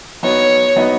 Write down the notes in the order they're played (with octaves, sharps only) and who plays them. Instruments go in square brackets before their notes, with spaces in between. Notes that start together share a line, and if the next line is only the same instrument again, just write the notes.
[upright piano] F#3 B3 D#4 [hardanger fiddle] C#5
[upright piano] F#3 B3 D#4